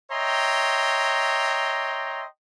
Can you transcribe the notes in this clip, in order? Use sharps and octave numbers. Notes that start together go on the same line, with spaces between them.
C#5 D#5 E5 G5 A#5 C6